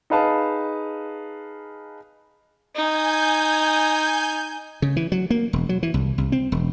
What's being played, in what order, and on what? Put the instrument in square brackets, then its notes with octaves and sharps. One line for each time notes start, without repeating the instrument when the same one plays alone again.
[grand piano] D#4 G#4 B4 F5 A5
[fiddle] D#4 [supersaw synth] G#5 G6
[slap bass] C#3
E3
F#3
A#3
E1
F#3
E3
C2
C2
C4
E1